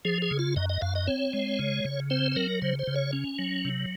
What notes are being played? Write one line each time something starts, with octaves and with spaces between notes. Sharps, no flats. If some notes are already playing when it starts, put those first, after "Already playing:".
F3 G#4
G#4
C#3
F4
F#2 D#5
D#5
F#2 F5
D#5
C4 C#5
G#3
C#3
C#3
C4 C5
C5
F#3 A#4
C#3 C5
C5
C#3
C#5
C#4
F#3
C3